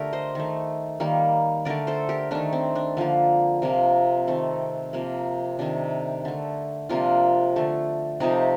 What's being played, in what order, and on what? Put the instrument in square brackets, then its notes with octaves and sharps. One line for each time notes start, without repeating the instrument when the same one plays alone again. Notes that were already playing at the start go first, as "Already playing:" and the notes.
Already playing: [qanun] D3 A3 G4 A#4
C5 D#5
D#3 A3
D#3 G3 A#3
D3 A3 A#4 D5
A4 C5
G4 A#4
D#3 A3 D4
C4
D4
D3 F3 A#3
C3 F3 A#3
D#3 A3 C4
C3 F3 A#3
C3 D#3 A3 D4
D3 A3
C3 F3 A#3 D4 F4
D3 A3
C3 F3 A3 D#4 G4